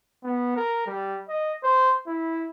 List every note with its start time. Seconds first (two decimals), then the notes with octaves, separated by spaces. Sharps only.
0.24 B3
0.57 A#4
0.87 G3
1.29 D#5
1.64 C5
2.07 E4